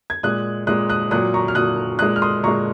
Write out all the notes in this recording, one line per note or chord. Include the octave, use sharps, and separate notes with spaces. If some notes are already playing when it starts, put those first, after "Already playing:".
G#6
A#2 G#3 D#6 F#6
A#2 G#3 D#6 F#6
D#6 F#6
A#2 F#3 D#6 F#6
A#5 C#6
F6
A#2 F#3 D#6 F#6
A#2 G#3 D#6 F#6
F6
C6 D#6
A#2 G#3 A#5 C#6